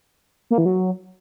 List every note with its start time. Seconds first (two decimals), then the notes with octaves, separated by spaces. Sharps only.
0.51 A#3
0.58 E3
0.65 F#3